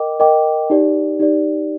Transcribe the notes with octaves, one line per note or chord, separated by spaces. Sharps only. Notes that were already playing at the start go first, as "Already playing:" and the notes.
Already playing: A#4 D#5 G5 D6
A#4 D#5 G5 D6
D#4 G4 D5
D#4 G4 D5